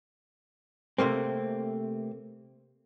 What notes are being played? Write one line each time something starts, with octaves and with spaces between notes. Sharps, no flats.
C3 A3 A#3 C4